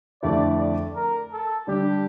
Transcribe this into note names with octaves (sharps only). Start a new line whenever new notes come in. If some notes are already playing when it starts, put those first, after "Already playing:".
F2 D3 A3 E4 D5
D5
A#4
A4
D3 G3 D4 G4